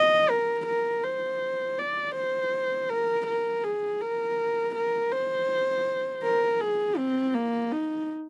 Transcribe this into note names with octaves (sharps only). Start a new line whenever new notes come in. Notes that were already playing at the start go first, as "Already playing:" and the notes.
Already playing: D#5
A#4
A#4
C5
D5
C5
A#4
A#4
G#4
A#4
A#4
C5
A#4
G#4
C4
A#3
D#4